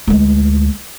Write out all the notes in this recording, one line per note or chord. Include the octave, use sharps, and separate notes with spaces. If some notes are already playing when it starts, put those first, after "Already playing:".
D2 G#3